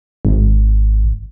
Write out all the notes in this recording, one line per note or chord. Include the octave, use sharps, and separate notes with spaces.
G#1